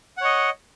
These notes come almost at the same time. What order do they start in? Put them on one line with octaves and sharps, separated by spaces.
F#5 C#5 D#5